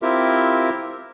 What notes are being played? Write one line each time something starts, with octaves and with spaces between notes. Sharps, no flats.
C4 E4 F4 G4 A#4 E5